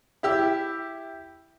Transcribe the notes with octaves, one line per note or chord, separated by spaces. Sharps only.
E4 G4 E6